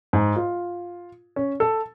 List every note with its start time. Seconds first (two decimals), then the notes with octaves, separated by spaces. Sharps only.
0.13 G#2
0.36 F4
1.36 C#4
1.60 A4